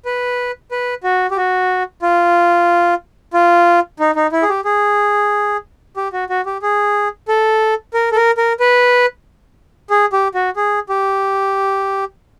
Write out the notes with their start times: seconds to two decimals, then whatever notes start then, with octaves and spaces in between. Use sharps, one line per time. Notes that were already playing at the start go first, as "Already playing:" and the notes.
0.05 B4
0.71 B4
1.04 F#4
1.31 G4
1.37 F#4
2.02 F4
3.34 F4
4.00 D#4
4.16 D#4
4.32 E4
4.42 G#4
4.49 G4
4.65 G#4
5.97 G4
6.13 F#4
6.30 F#4
6.46 G4
6.62 G#4
7.28 A4
7.94 A#4
8.12 A4
8.16 A#4
8.38 A#4
8.60 B4
9.90 G#4
10.13 G4
10.34 F#4
10.56 G#4
10.89 G4